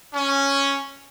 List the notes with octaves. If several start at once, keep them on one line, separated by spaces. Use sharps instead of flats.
C#4